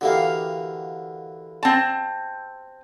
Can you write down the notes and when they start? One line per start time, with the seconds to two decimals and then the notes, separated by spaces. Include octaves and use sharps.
0.01 D3 E3 A#3 F#4 G4 F5
1.63 C4 A5